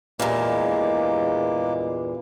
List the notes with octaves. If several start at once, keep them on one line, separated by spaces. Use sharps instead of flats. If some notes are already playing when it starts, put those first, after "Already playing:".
E2 G2 A#2 G#3 A#3 D6